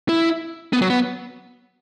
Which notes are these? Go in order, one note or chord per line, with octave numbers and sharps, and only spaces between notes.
E4
B3
F#3
B3